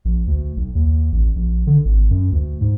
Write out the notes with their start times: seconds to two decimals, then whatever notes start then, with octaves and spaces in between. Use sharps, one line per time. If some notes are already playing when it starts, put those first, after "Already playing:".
0.05 A#1
0.27 D2
0.57 B1
0.75 D#2
1.12 A1
1.36 A#1
1.67 D3
1.85 G#1
2.10 F#2
2.32 D2
2.61 G#2